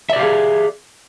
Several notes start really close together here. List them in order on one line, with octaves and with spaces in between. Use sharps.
E5 D5 G4 F5 G#4